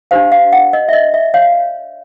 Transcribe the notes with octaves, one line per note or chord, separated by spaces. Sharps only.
D4 G4 C5 F5
F5
F#5
D#5
E5
D#5
E5
C#5 F5